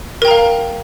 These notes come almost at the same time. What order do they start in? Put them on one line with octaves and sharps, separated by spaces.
A#4 G5 A#5 F5